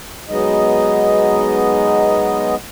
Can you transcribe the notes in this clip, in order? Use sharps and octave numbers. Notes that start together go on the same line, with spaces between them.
F#3 G#3 B3 D#4 D#5